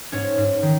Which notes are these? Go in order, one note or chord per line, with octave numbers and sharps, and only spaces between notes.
G#2 C#4 C#5
G#2
D#3